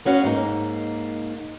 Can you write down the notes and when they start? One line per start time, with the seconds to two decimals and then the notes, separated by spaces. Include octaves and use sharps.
0.05 B3 C#4 F#4 F5
0.24 G#2 A#3 D#4